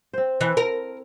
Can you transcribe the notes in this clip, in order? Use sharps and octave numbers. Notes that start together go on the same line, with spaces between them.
C4 C5
E3
A#4